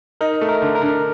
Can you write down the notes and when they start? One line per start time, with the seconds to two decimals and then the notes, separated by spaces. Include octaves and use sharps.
0.21 D#4 A#4
0.41 A3
0.49 A#4
0.62 D3
0.75 A#4
0.82 D3